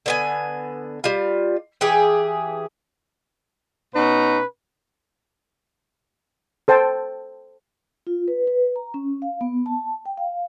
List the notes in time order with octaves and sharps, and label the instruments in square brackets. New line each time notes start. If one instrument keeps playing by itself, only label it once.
[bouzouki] D3 B3 G#5
G3 F4
E3 G4 G#4
[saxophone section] B2 C#4 D#4 [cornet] B4
[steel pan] A4 C5 G5 A5
[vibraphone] F4
B4
B4
A#5
C#4
F5
B3
A5
G5
F5